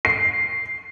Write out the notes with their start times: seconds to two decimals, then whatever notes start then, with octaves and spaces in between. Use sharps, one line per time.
0.05 C7